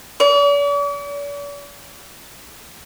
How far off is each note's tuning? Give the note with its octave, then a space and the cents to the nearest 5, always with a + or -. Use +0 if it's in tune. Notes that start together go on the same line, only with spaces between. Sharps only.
D5 -45